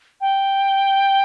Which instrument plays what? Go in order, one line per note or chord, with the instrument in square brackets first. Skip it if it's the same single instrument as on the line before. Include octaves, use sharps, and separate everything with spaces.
[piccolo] G5